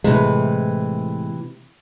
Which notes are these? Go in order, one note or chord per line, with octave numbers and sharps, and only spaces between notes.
A2 C3 E3 G#3